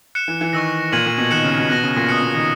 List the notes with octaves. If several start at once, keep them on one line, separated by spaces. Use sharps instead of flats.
F#6 C#7 E7
E3
E3
D#3 C#6 E6 A#6
A#2 G#6 D#7 F#7
A#2
B2
D#3 F#6 C#7 E7
C#3
B2
B2 F#6 A#6 E7
C#3
A#2
B2 D#6 F#6 C#7
B2
D#3